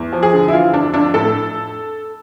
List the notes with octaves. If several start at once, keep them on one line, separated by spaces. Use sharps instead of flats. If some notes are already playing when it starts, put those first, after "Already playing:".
Already playing: E2
F3
G#4
D3
E4
E3 F4
F2 D4
F2 D4
A2 A4